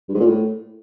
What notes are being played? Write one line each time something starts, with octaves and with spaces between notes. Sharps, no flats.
G2
G#2
A#2
A2